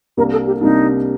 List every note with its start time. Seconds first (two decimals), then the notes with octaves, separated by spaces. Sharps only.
0.17 C2 C3 G3 A#3 D4 A#4
0.32 A4
0.47 G4
0.61 C2 C3 G3 A#3 D4 D#4